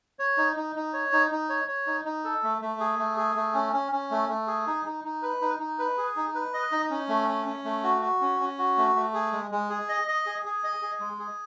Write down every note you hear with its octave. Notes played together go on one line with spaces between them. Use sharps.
C#5
D#4
D#4
D#4
C#5
D#4
D#4
C#5
C#5
D#4
D#4
A4
A3
A3
G#4
A3
G#4
A3
C#4
C#4
C#4
A3
A3
G#4
D#4
D#4
D#4
B4
D#4
D#4
B4
G#4
D#4
B4
D#5
D#4
C#4
A3
C#4
C#4
A3
F#4
F#4
C#4
C#4
F#4
A3
A3
G#4
G#3
G#3
G#4
D#5
D#5
G#4
G#4
D#5
G#4
G#3
G#4